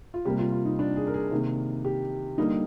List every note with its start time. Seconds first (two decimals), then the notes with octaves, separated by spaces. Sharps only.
0.14 F4
0.25 C3 G3 A#3 G4
0.39 F4
0.52 F4
0.65 D#4
0.79 D4
0.96 G#4
1.07 A#4
1.14 G#4
1.31 C3 D#3 A#3
1.85 G4
2.38 D3 G3 A#3 D#4